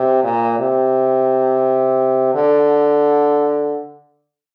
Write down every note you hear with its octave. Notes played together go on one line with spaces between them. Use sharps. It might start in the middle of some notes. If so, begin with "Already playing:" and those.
Already playing: C3
A#2
C3
D3